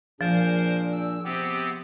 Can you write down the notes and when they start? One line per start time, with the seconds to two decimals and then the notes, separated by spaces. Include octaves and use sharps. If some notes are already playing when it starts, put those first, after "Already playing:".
0.21 A#2 F3 D4 G#4 A#4 C5
0.93 E6
1.25 C3 B3 C4 G4